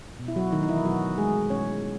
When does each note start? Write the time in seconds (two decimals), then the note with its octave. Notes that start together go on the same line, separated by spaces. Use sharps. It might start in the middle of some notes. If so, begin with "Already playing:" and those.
0.20 B2
0.28 E4
0.36 F#3 F#4
0.52 D#3 F#3 A3 D#4
0.63 D#4
0.69 E3 E4
0.85 B2 F#3 F#4
1.18 F#3 G#3 A3 G#4
1.50 B2 C#4 C#5
1.83 G#3